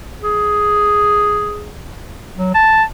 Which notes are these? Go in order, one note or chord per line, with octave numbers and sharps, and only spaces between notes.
G#4
F#3
A5